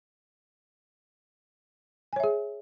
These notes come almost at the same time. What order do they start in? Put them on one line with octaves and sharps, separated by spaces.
G#5 C#5 E5 G#4